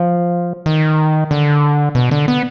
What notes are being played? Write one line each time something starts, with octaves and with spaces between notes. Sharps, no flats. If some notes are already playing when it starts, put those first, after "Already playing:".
Already playing: F3
D#3
D3
B2
D3
B3